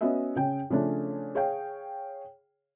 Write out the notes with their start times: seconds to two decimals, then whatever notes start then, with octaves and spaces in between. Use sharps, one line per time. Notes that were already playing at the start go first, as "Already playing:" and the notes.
0.01 B3 C#4 F#4 D#5 E5
0.36 C#3 C#4 G5
0.70 C#3 F3 A3 C#4 D4
1.35 G#4 C#5 F5 G5